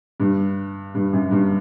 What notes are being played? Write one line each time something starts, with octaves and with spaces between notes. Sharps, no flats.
G2
G2
F#2
G2